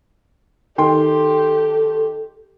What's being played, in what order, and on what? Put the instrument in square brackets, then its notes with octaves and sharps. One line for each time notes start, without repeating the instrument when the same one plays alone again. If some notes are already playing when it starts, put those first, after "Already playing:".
[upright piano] D#3 G5 C6 [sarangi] G4 [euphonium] A4